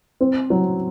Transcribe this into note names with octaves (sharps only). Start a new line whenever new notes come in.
C4
F#3